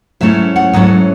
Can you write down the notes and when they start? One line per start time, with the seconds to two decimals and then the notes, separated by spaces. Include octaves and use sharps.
0.21 G#2 F#3 A3 C#4 E4 E5
0.56 F#5
0.73 G#2 F#3 A3 C#4 E4 D#5